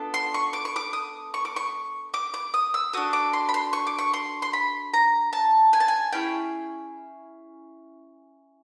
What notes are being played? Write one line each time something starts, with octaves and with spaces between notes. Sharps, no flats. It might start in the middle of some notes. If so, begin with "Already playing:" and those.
Already playing: B3 D4 F4 A4
C6
C#6
D6
C#6
D6
D#6
C#6
D6
C#6
D6
D6
D#6
E6
D4 F#4 A4 D#6
D6
C6
B5
C6
C#6
D6
C#6
C6
C6
B5
A#5
A5
G#5
A5
G#5
C#4 E4 G#4 G5